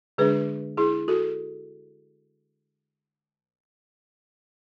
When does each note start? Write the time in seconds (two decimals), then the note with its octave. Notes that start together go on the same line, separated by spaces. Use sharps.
0.18 D3 G#3 D4 G#4 B4
0.77 E4 G#4
1.08 F#4 A4